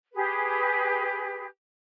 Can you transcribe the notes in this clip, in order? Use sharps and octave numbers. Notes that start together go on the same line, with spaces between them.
G4 G#4 B4